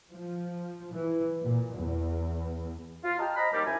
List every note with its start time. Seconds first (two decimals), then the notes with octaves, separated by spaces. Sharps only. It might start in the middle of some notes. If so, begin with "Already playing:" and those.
0.11 F3
0.93 E3
1.41 A#2
1.78 E2
3.04 F4
3.19 D#5 G5 A5 A#5 F6
3.37 C5 D#5 A#5 B5
3.53 D#2 G3
3.66 F#2 E4 G#5